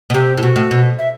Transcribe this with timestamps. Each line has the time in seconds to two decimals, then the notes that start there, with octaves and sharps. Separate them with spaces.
0.10 B2
0.14 C3 G4
0.37 A2
0.42 B2 F#4
0.56 A2
0.71 B2
0.99 E5